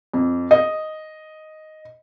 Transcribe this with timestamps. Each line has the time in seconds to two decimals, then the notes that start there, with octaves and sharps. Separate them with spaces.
0.13 F2
0.51 D#5